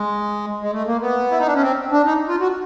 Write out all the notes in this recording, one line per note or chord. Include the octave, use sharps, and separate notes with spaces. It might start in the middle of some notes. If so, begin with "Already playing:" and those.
Already playing: G#3
G#3
A3
A#3
B3
E4
D#4
D4
C#4
C4
D4
D#4
F4
F#4